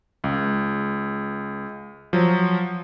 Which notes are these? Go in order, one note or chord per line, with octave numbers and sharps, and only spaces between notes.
C#2
F3 F#3